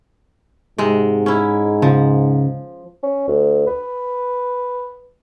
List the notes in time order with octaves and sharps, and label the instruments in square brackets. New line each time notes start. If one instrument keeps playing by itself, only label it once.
[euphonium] G#2 [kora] C3 G#3
[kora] C#4 E4
[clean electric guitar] C#2 C#3 [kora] F3
[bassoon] C#4
D2
B4